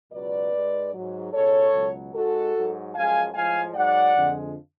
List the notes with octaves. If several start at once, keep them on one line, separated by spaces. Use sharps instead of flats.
C#2 B2 F#3 B4 D5
G#2 G#3
G#2 F#3
C#2 B2 G#3 A4 C#5
C#2 B2 F#3
G#2 G#3 F#4 A4
G#2 F#3
F#2 F3 G#3 F5 G#5
A2 F3 G#3 F5 G#5
G#2 F#3 D5 F#5
F2 D3 F3 G#3